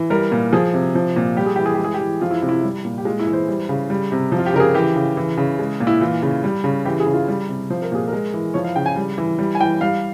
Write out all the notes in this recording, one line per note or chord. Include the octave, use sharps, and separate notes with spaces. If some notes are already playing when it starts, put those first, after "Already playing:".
Already playing: E3
G3 A#4
A#2
F3 G#4
C3
F3
A#2
G3 G4
G#4
E3 G4
G#4
G4
G#3
G#4
G4
E3
F3 F4
E4
C3
E4
G3
A#2
G4
G#3 F4
E4
E3
C5
G3
C#3
G3
C3
F3
F4
G4
C#3 A#4
G#4
E3 G4
C#3
E3
C#3
G#3
A#2
E4
E3 F4
C#3
G3
C#3
E3 G4
G#4
C#3
F4
G3
C3
F3 C5
A#4
A#2 G#4
G#3 A#4
E3
F3 C#5
F5
C#3 G5
G#5
G3
E3
G3
G#5
E3 G5
G3 F5